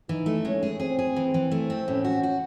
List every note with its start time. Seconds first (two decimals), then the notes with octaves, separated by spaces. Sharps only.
0.09 E3 D#4
0.26 A3
0.44 G#3 C#4
0.63 G#4
0.80 C4 G#4
0.99 G#4
1.16 E3
1.34 E3
1.51 A3
1.70 C4
1.88 A2 C#4
2.04 F#4
2.23 F#4